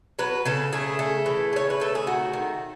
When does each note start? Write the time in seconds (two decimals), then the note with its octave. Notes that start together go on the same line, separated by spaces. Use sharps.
0.19 F#3 B4
0.45 C#3 A4
0.73 A3 G#4
0.99 A3
1.26 E3
1.53 C#3 C#5
1.70 B4
1.80 A3 A4
1.95 G#4
2.07 D#3 F#4
2.33 D#3